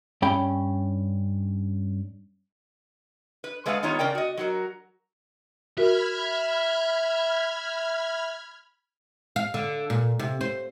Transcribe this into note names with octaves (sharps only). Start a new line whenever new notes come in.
G2 C#4 G5 B5
B4
G#3 A3 B4 F5 F#5
D#3 G3 B3 D#4 F4 C#5
C#3 A#4 D5 G5
F#4 D#5
F#3 F#4 A#4
F#4 A#4 E5 B5 F6 G#6
F5
D3
A#2
C3
C5